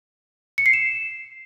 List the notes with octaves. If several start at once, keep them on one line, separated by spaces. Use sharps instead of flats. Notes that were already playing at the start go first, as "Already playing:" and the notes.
C#7
C7
E7